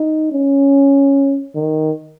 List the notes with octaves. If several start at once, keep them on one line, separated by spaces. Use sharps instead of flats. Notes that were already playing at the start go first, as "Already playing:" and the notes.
Already playing: D#4
C#4
D#3